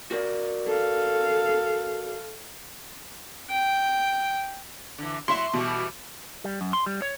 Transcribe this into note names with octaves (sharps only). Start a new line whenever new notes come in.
F#4 A#4 D5
A4 F5
G5
D3 E3
F#3 E4 E5 C6
B2 E3 G3 A3
G3
F#2
C6
G3
C#5